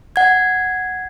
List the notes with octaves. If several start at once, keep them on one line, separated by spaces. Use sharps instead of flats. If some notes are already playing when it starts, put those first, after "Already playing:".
F#5 G#6